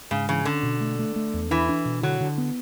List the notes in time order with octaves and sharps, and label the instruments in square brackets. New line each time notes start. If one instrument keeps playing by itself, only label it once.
[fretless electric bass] G#2 [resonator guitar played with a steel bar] C#3
[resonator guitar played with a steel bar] C#3 [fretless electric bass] E3
[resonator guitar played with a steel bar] D3 [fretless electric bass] C#4
[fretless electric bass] B2
A3
A3
A3
E2
[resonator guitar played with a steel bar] E3 [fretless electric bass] D4
[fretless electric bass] D4
B2
[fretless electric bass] D3 [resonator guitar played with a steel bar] F#3
[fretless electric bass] D3
B3